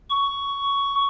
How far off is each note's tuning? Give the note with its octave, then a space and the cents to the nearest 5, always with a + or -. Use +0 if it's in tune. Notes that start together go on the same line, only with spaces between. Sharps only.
C#6 +10